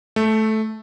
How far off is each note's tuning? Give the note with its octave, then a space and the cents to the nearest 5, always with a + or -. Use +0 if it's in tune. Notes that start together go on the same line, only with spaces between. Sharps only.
A3 -10